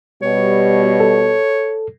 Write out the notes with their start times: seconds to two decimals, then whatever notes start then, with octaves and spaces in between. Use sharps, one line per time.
0.22 B2 G3 C#5
1.00 A4